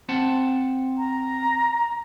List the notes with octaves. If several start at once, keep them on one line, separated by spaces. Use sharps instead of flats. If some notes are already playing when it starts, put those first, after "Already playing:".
C4 F#5 A5
A#5